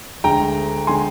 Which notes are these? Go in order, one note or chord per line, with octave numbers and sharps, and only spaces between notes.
D2 D3 G#3 G5 A#5
D3 G#3 G#5 C6